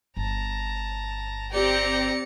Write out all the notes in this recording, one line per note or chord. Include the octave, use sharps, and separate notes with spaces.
G1 A5 A#5
C4 G4 D5 G5 A#5 C#7